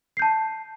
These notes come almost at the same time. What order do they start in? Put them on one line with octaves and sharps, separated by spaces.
C7 G6 A5